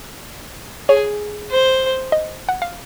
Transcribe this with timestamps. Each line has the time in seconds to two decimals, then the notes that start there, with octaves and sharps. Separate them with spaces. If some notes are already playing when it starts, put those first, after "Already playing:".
0.88 G#4 C#5
1.51 C5
2.12 D#5
2.49 F#5
2.62 F5